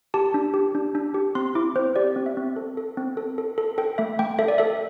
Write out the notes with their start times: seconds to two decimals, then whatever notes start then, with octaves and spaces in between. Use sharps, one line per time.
0.14 G4 A5
0.34 D4
0.54 G4
0.75 D4
0.95 D4
1.14 G4
1.35 C4 C6
1.55 E4 D6
1.76 C4 C5
1.96 G4 D5
2.16 C4
2.26 E5
2.37 C4
2.56 A4
2.77 A4
2.97 C4
3.17 A4
3.38 A4
3.58 A4
3.78 A4 G5
3.98 A3 E5
4.19 A3 G5
4.39 A4 E5
4.48 D5
4.58 A4 E5